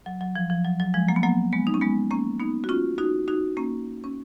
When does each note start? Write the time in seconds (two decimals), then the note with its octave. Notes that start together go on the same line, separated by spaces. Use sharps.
0.06 F#3
0.21 F#3
0.36 F3
0.50 F3
0.65 F#3
0.80 F#3
0.94 F3 G#3
1.08 F#3 A#3
1.16 B3
1.23 F#3 A#3
1.53 G#3 B3
1.67 D#4
1.74 C#4
1.81 G#3 B3
2.11 A#3 C#4
2.40 B3 D#4
2.64 F#4
2.69 C#4 F4
2.98 D#4 F#4
3.28 D#4 F#4
3.57 A#3 C#4
4.04 C#4